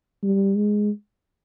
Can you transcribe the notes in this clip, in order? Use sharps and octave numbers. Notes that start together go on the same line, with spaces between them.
G3
G#3